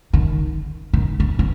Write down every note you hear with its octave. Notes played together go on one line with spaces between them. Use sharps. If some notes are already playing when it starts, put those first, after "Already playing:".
D#3
D#3
E3
E3